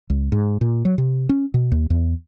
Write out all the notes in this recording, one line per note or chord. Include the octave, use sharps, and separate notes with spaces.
C#2
G#2
A#2
F#3
C3
C#4
B2
D#2
E2